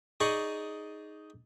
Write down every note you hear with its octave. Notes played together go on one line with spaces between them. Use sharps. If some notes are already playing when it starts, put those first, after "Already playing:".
D#4 G#4 D5 C#6 D#6